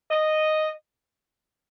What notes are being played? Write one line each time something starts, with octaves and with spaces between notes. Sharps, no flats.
D#5